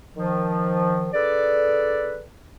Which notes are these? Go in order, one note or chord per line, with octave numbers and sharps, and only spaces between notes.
D#3 F3
D3 G#4 A4 B4 D5